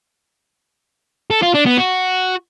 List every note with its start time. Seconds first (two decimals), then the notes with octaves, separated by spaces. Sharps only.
1.30 A4
1.42 F4
1.54 D4
1.66 B3
1.77 F#4